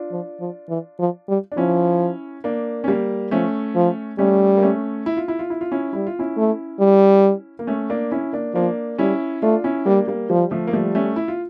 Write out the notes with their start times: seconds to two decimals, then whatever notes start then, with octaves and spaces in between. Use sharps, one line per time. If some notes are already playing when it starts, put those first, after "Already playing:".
Already playing: D4 F4
0.11 F3
0.40 F3
0.69 E3
0.99 F3
1.28 G3
1.52 D4
1.57 F3 C#4 E4
2.44 A#3 D4
2.84 C#4
2.88 G3 A#3
3.31 F3 A3 C#4
3.75 F3
4.18 G3 A3 C#4
4.57 A#3
4.62 A3 C#4
5.06 E4
5.17 F4
5.28 E4
5.39 F4
5.50 E4
5.61 F4
5.72 C#4 E4
5.93 G3 E4
6.07 F4
6.19 C#4 E4
6.37 A3
6.80 G3
7.59 A#3
7.67 A3 C#4
7.90 A#3 D4
8.12 C#4 E4
8.33 A#3 D4
8.54 F3 A#3 D4
8.98 G3 C#4 E4
9.42 A3 D4 F4
9.64 C#4 E4
9.86 G3 A#3 D4
10.07 G3 A#3
10.29 F3 G3
10.51 F3 A3
10.67 A#3
10.73 F3 G3 A3
10.95 A3 C#4
11.16 E4
11.28 F4